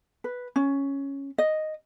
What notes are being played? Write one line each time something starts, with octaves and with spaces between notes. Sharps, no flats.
B4
C#4
D#5